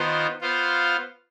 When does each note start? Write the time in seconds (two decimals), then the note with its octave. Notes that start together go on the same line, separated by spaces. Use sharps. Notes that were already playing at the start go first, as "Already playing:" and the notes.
Already playing: D#3 B3 F4 C5
0.41 B3 F4 C5 F5